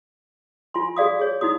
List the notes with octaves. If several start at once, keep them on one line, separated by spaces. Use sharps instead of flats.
F4 G#5 C6
F#4 G#4 D5 F5 D#6
G#4 C#5
D#4 E4 F#4 D#6